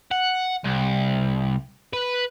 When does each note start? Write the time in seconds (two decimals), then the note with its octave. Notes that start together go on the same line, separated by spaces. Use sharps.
0.11 F#5
0.65 C2
1.93 B4